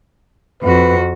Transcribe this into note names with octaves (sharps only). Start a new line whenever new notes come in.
F2 F#4 B4